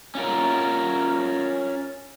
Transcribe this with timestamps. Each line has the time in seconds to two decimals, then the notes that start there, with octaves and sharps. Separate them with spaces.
0.15 C#4 F4 A#4